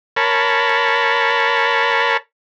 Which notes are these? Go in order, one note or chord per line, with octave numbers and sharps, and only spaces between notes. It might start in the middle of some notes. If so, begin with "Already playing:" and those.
A#4 C#5 A5 B5